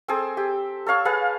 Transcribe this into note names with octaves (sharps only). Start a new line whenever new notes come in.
C4 G#4 A4
G4
A4 C#5 F5 C#6
G#4 B4 F5 A5